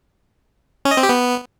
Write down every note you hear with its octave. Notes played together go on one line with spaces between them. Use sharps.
C#4
D#5
C4
G4
B3